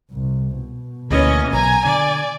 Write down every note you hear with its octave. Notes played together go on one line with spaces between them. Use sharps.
C2
B2
D2 E3 A#3 C#4 D#5
B1 G#5 A#5
D3 D5